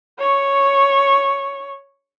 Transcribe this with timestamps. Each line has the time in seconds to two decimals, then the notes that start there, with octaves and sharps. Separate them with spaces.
0.18 C#5 C#6